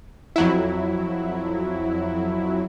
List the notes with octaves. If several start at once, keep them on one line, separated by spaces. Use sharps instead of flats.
F2 F#3 E4